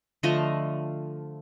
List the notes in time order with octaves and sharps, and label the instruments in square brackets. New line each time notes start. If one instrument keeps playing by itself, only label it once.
[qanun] D3 F3 A3 D#5